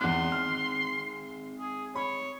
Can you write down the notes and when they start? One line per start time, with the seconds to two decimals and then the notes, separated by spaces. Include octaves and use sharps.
0.01 E2 G#3 C4 D#4 C6 F#6
0.32 F6
1.59 G#4
1.96 C#5 B5